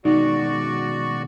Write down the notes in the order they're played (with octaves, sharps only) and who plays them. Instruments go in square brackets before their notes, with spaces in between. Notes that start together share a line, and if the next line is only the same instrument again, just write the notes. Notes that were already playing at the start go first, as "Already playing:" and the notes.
[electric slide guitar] B2 D#3 G#3 [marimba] D#4 [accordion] F#4 D5 C#6